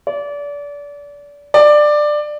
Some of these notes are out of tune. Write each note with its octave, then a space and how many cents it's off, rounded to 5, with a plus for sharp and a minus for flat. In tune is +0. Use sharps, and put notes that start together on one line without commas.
D5 -30
D5 +15